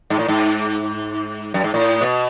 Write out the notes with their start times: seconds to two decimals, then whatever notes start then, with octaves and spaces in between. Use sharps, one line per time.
0.10 G#2
0.19 A2
0.28 G#2
1.54 F#2
1.64 G#2
1.74 A2
2.01 B2